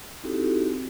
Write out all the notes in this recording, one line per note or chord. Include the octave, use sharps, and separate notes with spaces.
C4 D#4 E4 F#4 G4 A4